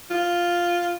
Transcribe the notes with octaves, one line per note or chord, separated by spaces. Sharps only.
F4